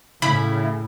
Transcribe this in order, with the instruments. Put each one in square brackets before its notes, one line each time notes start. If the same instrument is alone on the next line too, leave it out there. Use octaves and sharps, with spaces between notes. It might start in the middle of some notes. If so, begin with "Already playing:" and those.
[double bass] A2 [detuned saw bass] C#3 [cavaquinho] E4 [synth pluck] B5